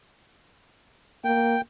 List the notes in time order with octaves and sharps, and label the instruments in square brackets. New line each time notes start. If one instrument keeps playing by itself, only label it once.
[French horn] A#3 [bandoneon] G5